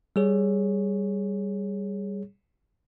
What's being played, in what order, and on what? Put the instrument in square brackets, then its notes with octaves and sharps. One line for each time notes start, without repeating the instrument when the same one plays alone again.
[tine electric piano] G3 G#4 C#5